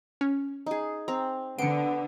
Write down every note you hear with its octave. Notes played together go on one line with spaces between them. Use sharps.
C#4
D#4 G#4
C4 A#5
D3 B3 C6 C#7 D7